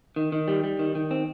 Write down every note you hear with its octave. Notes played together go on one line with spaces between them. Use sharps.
D#3
D#3
G3
G3
D#3
D#3
C4